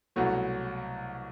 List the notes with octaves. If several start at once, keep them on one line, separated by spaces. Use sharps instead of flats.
C2 B2 F#3 A3